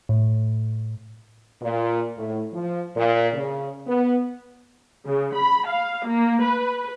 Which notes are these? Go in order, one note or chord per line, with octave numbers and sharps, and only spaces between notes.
A2
A#2
A2
F3
A#2
C#3
B3
C#3
B5
F5
A#3
B4